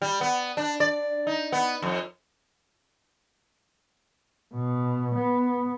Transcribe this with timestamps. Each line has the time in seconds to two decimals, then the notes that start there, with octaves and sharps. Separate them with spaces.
0.02 G3
0.21 B3
0.57 D4
0.80 D5
1.27 D#4
1.52 B3
1.82 F2
4.54 B2
5.16 B3